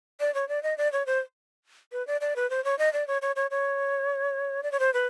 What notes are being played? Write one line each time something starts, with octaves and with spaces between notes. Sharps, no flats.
D5
C#5
D5
D#5
D5
C#5
C5
B4
D5
D5
B4
C5
C#5
D#5
D5
C#5
C#5
C#5
C#5
D5
C#5
C5
B4